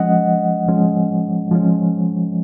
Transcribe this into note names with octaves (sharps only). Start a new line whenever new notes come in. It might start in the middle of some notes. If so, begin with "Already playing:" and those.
Already playing: F3 G#3 C#4 D#5 F#5
F3 G#3 C#4
F3 G#3 C#4